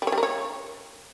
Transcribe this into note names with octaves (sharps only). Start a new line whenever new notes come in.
G3
C#5
G3
A#4
C#5